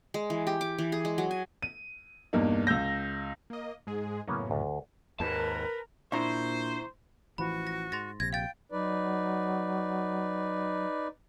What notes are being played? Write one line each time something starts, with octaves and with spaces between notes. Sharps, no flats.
G#3
E3
G4
D6
E3
G#4
G#3
F#3
G#5
D#7
E2 G2 A#2 A#3 D#4
C#2 E6 G6 A#6
A#3 D#5
G#2 G#3 G#4
F#2 A2 C#3 A#3 B3 C#4
D2
D#2 G#2 A#4 B4 A5
A#2 D4 E4 C5 E5 A#5 C#6
A1 E3 F3 F#4 B5
A#6
G#2 C6 A6 A#6
A#1 C3 G#6 A#6
F5 G5 A6
F#3 D#4 B4 D5